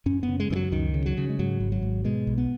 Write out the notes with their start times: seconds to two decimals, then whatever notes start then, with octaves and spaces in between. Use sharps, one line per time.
0.06 F#2 C#4
0.23 B3
0.28 C#3
0.40 G#3
0.50 F#2 D#3
0.55 F#3
0.72 C#2 D#3
0.94 C#3
1.06 F#3
1.17 C#3
1.29 G#3
1.39 G#2 F#3
1.60 G#1
1.72 F#3
1.82 G#2
2.04 B2 G#3
2.27 B1
2.38 B3